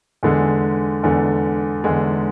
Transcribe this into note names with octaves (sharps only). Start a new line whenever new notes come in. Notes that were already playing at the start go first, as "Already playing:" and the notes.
E2 D3 G#3
E2 D3 G#3
E2 D3 G#3